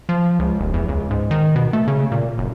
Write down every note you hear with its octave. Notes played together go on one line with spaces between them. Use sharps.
F3
C#2
D#1
E2
C#2
G#2
D#3
B2
A3
C#3
A#2
F#1